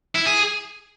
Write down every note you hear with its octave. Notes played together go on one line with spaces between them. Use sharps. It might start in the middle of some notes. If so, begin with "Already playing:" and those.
E4
G#4